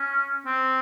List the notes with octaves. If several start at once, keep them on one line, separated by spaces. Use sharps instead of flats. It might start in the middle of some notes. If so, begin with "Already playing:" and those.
Already playing: C#4
C4